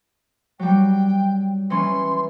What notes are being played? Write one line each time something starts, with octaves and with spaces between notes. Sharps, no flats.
F#3 G3 G5
E3 C#4 C6